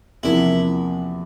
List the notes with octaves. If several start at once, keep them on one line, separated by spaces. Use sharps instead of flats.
E2 C3 F3 A#3 E4